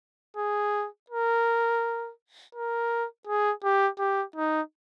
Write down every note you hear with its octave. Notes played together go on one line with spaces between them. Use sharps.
G#4
A#4
A#4
G#4
G4
G4
D#4